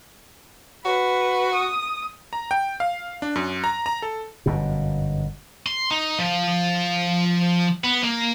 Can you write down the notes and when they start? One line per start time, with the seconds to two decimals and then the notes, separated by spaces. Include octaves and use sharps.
0.85 F#4 B4
1.53 D#6
2.33 A#5
2.51 G5
2.80 F5
3.22 D4
3.36 F#2
3.64 A#5
3.86 A#5
4.02 A4
4.46 G1 F#2 B2
5.66 C6
5.91 D#4
6.19 F3
7.84 B3
8.04 A#3